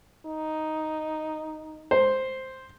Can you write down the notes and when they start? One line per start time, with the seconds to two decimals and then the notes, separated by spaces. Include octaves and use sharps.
0.26 D#4
1.91 C5